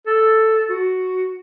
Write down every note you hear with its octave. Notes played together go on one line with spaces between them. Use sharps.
A4
F#4